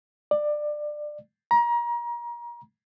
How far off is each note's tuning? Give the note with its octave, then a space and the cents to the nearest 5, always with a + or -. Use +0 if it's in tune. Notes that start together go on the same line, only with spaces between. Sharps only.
D5 +20
A#5 +30